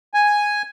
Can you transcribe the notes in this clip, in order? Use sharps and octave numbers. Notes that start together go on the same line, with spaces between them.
G#5